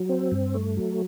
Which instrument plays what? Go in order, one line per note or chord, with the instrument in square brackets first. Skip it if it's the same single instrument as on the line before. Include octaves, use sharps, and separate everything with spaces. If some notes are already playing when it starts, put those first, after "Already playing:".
Already playing: [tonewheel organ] F#3
C4
G2
A3
F#3